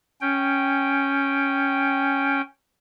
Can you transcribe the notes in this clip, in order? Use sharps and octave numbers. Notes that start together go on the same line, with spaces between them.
C#4 G5